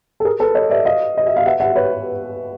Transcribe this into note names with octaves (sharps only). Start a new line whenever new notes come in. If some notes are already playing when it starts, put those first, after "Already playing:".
A4
G#4 A#4
A4 B4
C#5 D#5
D5 E5
D#5 F5
D#5
E5
F5
E5 F#5
E5 F#5
B4 C#5